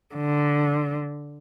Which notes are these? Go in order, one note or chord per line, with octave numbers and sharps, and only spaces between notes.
D3